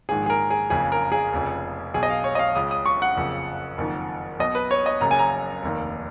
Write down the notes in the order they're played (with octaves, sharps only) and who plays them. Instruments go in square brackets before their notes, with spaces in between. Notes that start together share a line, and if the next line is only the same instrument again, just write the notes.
[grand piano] A#1 G#2 D#3 G#4
G#4
A#4
G#4
F#1 F2 C#3 G#4
A#4
G#4
F1 F2 C#3
B1 B2 G#4
D#5
F5
C#5
D#5
F5
C#2 C#3 D#6
D#6
C#6
F#5
F#1 F2 C#3
F#1 F2 D#3
B1 B2 D#5
B4
C#5
D#5
F#1 F#2 C#3 A#5
G#5
A#5
F1 D#2 D#3